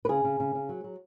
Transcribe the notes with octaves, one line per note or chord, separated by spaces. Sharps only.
B4
C#3 G#4
C#3
C#3
C#3
F#3
F#3